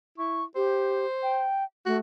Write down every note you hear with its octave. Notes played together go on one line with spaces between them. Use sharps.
E4 C#6
G4 C5
G5
A3 F#4